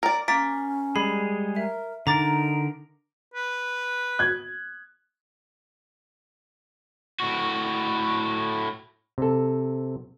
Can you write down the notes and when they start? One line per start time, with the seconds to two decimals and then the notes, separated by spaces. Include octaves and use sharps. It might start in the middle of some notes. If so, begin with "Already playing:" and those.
0.03 A#4 D5
0.28 A#3 C#4 A6 B6 D7
0.96 G3 G#3 G#4 B5
1.56 A#4 E5
2.07 D3 D#4 A#4 A#5 D6 A6
3.34 B4
4.19 F#6 G#6
7.20 A2 F#4
9.18 C3 A4